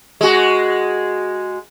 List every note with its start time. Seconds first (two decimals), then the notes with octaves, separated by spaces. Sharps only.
0.21 G#3 F#4